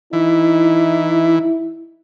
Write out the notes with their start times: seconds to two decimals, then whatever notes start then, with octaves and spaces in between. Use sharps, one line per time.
0.13 E3 D#4 E4